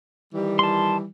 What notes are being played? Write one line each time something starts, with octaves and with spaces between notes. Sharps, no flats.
D#3 E3 G3
A5 C6